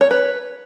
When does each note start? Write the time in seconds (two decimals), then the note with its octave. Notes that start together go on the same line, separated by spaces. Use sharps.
0.01 C#5
0.11 B4